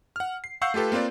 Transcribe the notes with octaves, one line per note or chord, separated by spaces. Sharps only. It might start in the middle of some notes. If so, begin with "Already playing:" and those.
F#5 F6
C7
F5 F#5 C#6 E6 G6 C7
A3 F4 G4 A4 B4
A#3 C4 F4 B4 D5